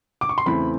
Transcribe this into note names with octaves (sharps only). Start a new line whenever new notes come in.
D6
C#6
C6
E2 C#3 E3 A3 C4 B5